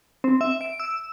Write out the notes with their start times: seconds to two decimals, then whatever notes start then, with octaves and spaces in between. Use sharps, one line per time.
0.24 C4
0.41 E5
0.61 D7
0.80 E6